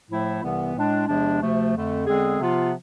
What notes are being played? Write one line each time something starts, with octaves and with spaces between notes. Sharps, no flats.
A2 F3 A3 E4
C2 C3 E3 B3
A2 G#3 D4
E2 C3 F3 G#3 D4
D2 C3 F3 A3
F2 D3 A3
E2 D3 G#3 C4 G#4
C3 F3 B3 F4